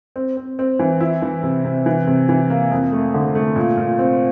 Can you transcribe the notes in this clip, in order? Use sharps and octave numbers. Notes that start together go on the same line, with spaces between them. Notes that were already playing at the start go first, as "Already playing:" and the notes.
C4
C4
C4
E3
E4
E3
C3
C3
E3
C3
E3
A#3
F2
A3
D3
A3
A#2
A#2
C4